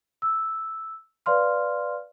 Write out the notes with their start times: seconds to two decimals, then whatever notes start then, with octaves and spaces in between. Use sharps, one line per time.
0.22 E6
1.26 B4 D5 F5 C6 F6